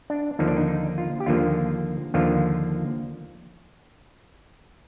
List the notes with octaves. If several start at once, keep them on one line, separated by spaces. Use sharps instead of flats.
D4
D#2 D3 F3 A#3 D#4
D4
D#4
D#4
F4
G4
D#2 D3 F3 A#3 F4
D#2 D3 F3 A#3 F4